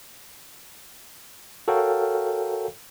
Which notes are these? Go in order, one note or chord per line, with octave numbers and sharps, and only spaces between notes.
F#4 A4 A#4 C#5 F5 G5